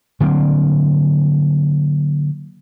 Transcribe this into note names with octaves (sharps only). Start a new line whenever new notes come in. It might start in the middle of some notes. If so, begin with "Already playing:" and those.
D3 F#3 A#3 C4